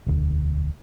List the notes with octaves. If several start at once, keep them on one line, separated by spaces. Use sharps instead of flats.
E1 D2